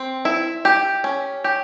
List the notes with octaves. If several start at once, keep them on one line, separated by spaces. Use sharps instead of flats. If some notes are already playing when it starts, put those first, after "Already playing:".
Already playing: C4
E4
G4
C#4
G4